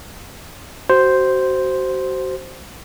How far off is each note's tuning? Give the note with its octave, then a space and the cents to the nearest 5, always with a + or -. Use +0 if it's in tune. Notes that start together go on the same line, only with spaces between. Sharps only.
F#4 +30 C5 +0